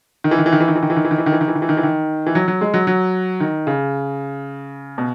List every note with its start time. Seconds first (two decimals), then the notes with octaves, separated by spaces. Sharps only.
0.24 D#3
0.31 E3
0.38 D#3
0.46 E3
0.52 D#3
0.60 E3
0.68 D#3
0.75 E3
0.83 D#3
0.90 E3
0.96 D#3
1.05 E3
1.11 D#3
1.18 E3
1.26 D#3
1.32 E3
1.41 D#3
1.48 E3
1.55 D#3
1.62 E3
1.69 D#3
1.77 E3
1.83 D#3
2.26 E3
2.35 F#3
2.48 F#3
2.61 G#3
2.74 F#3
2.87 F#3
3.40 D#3
3.67 C#3
4.98 B2